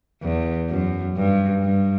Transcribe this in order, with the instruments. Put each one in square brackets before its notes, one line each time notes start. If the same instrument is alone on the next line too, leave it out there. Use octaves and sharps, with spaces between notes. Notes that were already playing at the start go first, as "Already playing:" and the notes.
[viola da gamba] E2
F#2
G2
G2